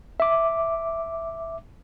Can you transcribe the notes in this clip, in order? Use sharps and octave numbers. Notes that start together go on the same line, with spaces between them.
E5 D6